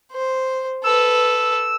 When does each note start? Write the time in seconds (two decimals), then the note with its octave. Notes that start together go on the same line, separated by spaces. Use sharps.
0.12 C5
0.84 A4 B4 E6